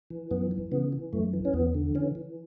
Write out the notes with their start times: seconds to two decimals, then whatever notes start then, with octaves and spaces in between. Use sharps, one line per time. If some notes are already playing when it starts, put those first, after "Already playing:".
0.10 E3
0.31 F#2 B3
0.51 E3
0.72 C#3 B3
0.92 E3
1.13 F#2 A3
1.33 E3
1.45 C#4
1.53 E2 B3
1.75 D3
1.95 E3 C#4
2.15 E3